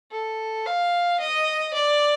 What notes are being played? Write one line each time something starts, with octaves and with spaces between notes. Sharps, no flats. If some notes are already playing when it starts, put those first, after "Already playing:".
A4
F5
D#5
D5